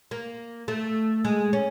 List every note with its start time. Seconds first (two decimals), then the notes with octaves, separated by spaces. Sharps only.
0.11 A#3
0.68 A3
1.25 G#3
1.53 C#4